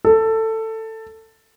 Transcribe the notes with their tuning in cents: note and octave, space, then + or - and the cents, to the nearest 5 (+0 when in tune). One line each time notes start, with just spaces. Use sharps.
A4 +15